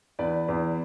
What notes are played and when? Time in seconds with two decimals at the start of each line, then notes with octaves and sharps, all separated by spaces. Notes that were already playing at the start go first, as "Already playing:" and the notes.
0.19 E2 B4 D5
0.48 E2